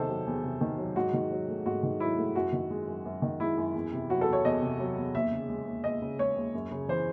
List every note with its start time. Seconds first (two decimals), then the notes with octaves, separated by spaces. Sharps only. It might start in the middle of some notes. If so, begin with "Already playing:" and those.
Already playing: E2 C3 D#3 A4 C5
0.08 F#3
0.26 E2
0.43 C3
0.61 D#3
0.78 F#3
0.96 G#2 F#4
1.13 D#3
1.31 F#3
1.48 A3
1.66 G#2 F#4
1.83 D#3
2.00 F#3 E4
2.18 A3
2.35 F#2 F#4
2.53 D#3
2.70 G#3
2.87 F#2
3.05 F#2
3.22 D#3
3.40 G#3 E4
3.57 F#2
3.75 E2
3.93 C3
4.10 F#3 F#4
4.21 A4
4.27 E2
4.33 C#5
4.45 E2 D#5
4.62 C3
4.79 F#3
4.97 E2
5.14 D#2 E5
5.32 C#3
5.49 G#3
5.67 D#2
5.84 D#2 D#5
6.02 C#3
6.19 G#3 C#5
6.36 D#2
6.54 F#2
6.71 C#3
6.88 E3 C5